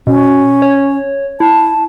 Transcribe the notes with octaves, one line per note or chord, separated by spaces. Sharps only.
B2 C#4
C#5
E4 A5